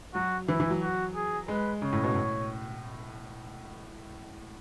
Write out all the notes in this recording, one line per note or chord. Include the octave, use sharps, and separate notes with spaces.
F#3 F#4
E3 E4
E3
F#3
F#4
G#4
G#3 B4
C#3 C#5
A2
B2
A2